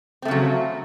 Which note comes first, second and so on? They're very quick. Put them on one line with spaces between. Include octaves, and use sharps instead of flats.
C4 A3 C#3 F#3